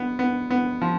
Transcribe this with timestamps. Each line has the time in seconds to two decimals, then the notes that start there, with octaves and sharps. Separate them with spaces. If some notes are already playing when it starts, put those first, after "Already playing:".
Already playing: B3
0.19 B3
0.50 B3
0.81 F3